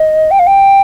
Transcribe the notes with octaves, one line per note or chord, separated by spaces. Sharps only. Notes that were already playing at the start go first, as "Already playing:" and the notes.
Already playing: D#5
G5
F5
G5